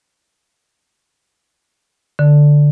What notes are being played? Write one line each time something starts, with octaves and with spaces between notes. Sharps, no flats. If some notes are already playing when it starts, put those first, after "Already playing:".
D3